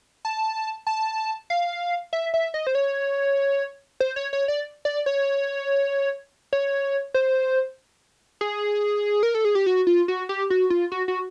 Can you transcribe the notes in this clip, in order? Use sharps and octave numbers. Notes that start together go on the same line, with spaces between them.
A5
A5
F5
E5
E5
D#5
C5
C#5
C5
C#5
C#5
D5
D5
C#5
C#5
C5
G#4
A#4
A4
G#4
G4
F#4
F4
F#4
G4
F#4
F4
F#4
F#4